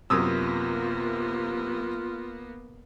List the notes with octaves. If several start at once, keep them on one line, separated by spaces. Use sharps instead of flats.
F#2 C3 A#3 B3 F4 D#6 E6